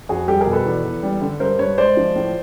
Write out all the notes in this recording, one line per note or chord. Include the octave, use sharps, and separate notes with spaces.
F2 F#4 G#4
G3 G4 A4
G#4 A#4
B2
A4 B4
E2
E2
G3
D3
G2 A#4 C5
G2 B4 C#5
G#3 C5 D5
F3
A2